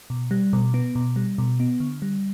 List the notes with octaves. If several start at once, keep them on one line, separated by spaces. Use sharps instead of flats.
B2
G3
B2
B3
B2
G3
B2
B3
D3
G3